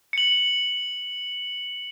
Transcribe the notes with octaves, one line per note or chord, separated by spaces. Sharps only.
C#7 F#7